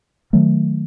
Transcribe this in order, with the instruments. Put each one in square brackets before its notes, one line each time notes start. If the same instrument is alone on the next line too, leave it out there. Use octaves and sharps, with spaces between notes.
[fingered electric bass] D#3 F#3 A3